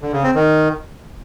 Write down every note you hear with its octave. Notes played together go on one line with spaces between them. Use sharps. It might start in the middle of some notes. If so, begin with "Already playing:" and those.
D3
C#3
C4
D#3